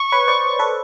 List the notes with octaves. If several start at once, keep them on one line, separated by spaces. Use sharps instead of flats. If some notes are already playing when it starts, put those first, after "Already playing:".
Already playing: C#6
B4 C#5
C5 D5
A4 B4